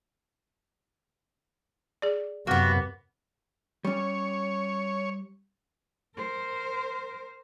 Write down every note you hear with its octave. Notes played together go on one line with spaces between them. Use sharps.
G#4 D5
F#2 C3 A#3 B3 F#4
G3 C#4 C#5
A#4 C5